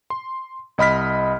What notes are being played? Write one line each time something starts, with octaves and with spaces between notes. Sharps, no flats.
C6
C2 D#5 B5 F6 B6